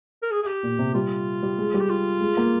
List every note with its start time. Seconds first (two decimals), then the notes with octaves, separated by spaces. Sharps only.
0.23 A#4
0.31 G#4
0.43 G#4
0.47 G4
0.63 A#2
0.79 C3
0.95 G3 F4
1.43 G3
1.58 G#3
1.74 G3
1.80 G4
1.90 F4
2.21 G#3
2.37 A#3